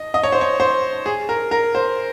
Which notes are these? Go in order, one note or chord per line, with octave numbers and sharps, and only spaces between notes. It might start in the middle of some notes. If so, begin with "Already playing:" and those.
Already playing: D#5
D#5
C#5
C5
C#5
C5
G#4
A#4
A#4
C5